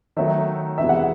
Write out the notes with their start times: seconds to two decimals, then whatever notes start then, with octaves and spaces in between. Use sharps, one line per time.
0.16 D#3 F#3 A3 D#4 E5
0.78 E2 C3 E3 G#3 E5
0.89 F#5